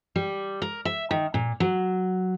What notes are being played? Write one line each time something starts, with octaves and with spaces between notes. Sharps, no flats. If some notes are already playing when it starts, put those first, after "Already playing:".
G3
A#4
E5
D#3
A#2
F#3